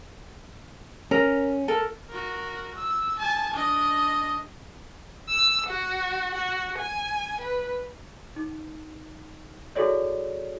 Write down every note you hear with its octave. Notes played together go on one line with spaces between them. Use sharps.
C#4 A#4
A4 A#4
F#4 A#4
E6
G#5 A5
D4 D#5
E6
F#4
F#4
G#5
B4
D#4
E4 F#4 G#4 A4 C#5 D5